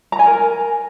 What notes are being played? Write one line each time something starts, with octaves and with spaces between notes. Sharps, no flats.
A#5
G#5
A#4